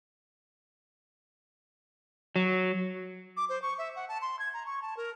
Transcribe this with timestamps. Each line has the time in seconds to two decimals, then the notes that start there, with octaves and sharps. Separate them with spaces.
2.36 F#3
3.37 D6
3.49 C5
3.62 C#6
3.78 E5
3.96 F#5
4.09 A5
4.22 C6
4.39 G#6
4.54 A#5
4.66 C#6
4.82 A5
4.97 A#4